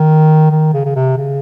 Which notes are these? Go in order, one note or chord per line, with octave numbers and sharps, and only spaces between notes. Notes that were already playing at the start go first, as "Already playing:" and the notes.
Already playing: D#3
D#3
C#3
C#3
C3
C#3